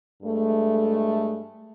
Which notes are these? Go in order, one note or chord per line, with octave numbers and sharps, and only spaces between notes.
G2 G#3 A3